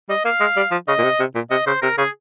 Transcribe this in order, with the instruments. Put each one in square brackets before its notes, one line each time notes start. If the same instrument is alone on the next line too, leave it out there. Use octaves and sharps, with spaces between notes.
[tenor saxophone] G3 [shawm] D#5
[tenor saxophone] A#3 [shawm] F5
[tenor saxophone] G#3
G3
F3
[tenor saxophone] C#3 [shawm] D#5
[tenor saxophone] A#2
C3
C3
A#2
[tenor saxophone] C3 [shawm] D#5
[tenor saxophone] C#3 [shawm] C5
[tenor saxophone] C3 [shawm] A#4
[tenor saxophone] C#3 [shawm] G#4